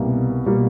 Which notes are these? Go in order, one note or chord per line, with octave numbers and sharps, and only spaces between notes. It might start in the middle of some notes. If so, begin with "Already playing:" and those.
Already playing: C2 B2 G3 A#3
B2 G3 A#3